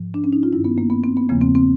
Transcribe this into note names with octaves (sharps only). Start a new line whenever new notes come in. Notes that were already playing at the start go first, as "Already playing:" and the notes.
Already playing: G#2 F3
D4
C#4
D#4
F4
G2 D#3 E4
B3
A#3
B3
C4
B3
E2 C#3 F3 A#3
C4
C4